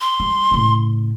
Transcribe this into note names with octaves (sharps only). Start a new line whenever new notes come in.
C6
G3
A2 C#3